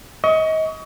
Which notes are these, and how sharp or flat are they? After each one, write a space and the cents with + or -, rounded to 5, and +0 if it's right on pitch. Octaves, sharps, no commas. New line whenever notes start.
D#5 +30 C#6 +25